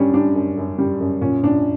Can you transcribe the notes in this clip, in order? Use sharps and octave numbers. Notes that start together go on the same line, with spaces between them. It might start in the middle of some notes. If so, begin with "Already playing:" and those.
Already playing: F#2 G3 C#4 D4
G3 D4
F#2
F#2
G3
F#2
A#2 C#4
A#2 D4